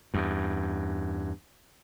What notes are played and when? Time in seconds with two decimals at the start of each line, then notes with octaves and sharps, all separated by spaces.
0.14 E2 G2